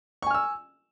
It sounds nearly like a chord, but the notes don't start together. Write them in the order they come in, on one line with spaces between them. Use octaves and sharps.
C#6 G#5 F6 E6